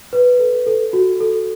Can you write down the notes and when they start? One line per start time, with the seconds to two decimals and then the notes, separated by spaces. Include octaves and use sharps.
0.13 B4
0.39 A4
0.66 A4
0.93 F#4
1.20 A4